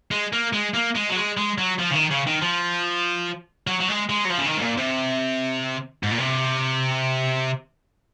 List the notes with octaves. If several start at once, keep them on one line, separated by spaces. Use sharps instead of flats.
G#3
A#3
G#3
A#3
G#3
F#3
G#3
G#3
F#3
F3
C#3
D#3
C#3
D#3
F3
F#3
F#3
G#3
G#3
F#3
F3
C#3
D#3
G#2
A#2
C3
G#2
A#2
C3